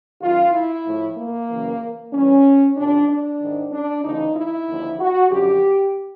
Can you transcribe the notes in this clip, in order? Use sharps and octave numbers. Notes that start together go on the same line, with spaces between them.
F#2 D#3 F4
E4
A2 F3
A#3
F#2 C#3 E3
G2 E3 C#4
F2 C3 D#3 D4
D4
G#2 D#3
D4
D2 C#3 E3 D#4
E4
D#2 D3 F3
F#4
F#2 D3 F3 G4